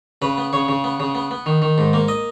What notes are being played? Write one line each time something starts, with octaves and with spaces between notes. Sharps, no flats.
C#3 B4
B3
C#3 C#5
C#3
B3
C#3
B3
B3
D#3
D#3
G#2
A#3
D#5